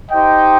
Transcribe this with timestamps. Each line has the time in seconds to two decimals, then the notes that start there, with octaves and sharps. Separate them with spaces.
0.10 D#4 G4 C5 D#5 G5